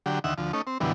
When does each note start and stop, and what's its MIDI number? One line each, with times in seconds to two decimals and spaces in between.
0.06 0.19 50
0.06 0.19 54
0.06 0.19 67
0.24 0.34 38
0.24 0.34 51
0.24 0.34 76
0.24 0.34 78
0.38 0.52 38
0.38 0.52 53
0.53 0.62 57
0.53 0.62 61
0.53 0.62 63
0.67 0.78 60
0.80 0.92 42
0.80 0.92 47
0.80 0.92 50
0.80 0.92 52
0.80 0.92 55